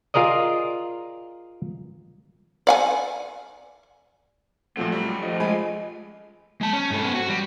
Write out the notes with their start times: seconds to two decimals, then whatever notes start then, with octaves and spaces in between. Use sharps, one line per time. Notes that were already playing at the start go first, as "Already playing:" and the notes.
0.14 F4 G#4 A#4 D5 D#5
2.67 D5 F#5 G#5
4.77 A#2 F3 F#3 A3 C4 F#4
4.92 G3
5.05 C#2
5.23 D#3 F3 A3 D#5
5.40 G#3 G#5 B5
6.61 G#3 A5
6.73 C#4
6.91 G#2 A4
7.03 B3 C#4
7.15 F#4
7.28 G3